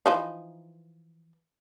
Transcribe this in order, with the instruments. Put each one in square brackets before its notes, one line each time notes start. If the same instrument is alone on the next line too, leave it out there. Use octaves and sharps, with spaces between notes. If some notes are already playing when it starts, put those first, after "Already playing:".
[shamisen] E3 F3 D#4